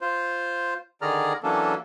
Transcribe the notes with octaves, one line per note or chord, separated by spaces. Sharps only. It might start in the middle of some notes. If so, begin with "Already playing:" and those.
F4 C5
D3 D#3 G#4 D5 A#5 F6
E3 F#3 A#3 C#4 D4 A4